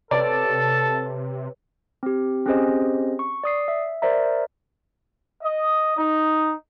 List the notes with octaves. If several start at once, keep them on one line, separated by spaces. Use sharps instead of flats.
C3 A4 B4 C#5 D5 A5
C4 G4
C4 C#4 G4 G#4 C5 D#5
C#6
D5 D#6 C7
E5
A#4 C5 D5 E5 A#5
D#5
D#4